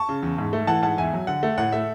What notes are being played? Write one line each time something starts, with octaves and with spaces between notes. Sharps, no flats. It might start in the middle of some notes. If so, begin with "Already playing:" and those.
Already playing: A5 C#6
C#3
E2
G#2
A3
E3 F#5 A5
G#2 F#5 A5
E2 E5 G#5
F#3
D3 F#5
A3
A2 F#5
A3 E5